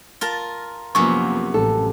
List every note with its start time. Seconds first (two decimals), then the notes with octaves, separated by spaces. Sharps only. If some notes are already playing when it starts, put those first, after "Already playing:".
0.21 F4 A#4 A5
0.95 F#2 C3 F3 A#3 B3 C#6
1.54 A1 A4